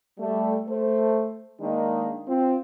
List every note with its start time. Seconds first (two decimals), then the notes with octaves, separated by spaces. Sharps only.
0.19 G3 A3
0.69 A3 C5
1.60 D#3 G#3 A#3 D4
2.28 C4 F4